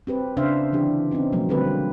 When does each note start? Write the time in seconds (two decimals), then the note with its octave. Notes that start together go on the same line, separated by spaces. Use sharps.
0.07 C4 G4 B4
0.37 C#3 D4 C5 E5 F5
0.72 D3 E3 D4 G4
1.11 C4 C#4 D#4 F4
1.32 B2 F3 F#3 G#3 A#3
1.49 D3 G3 A#3 C4 G4 B4